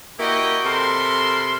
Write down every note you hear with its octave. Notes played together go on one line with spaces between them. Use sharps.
A#3 E4 F#4 G4 D#5 G5
C3 A4 A#4 B5 C6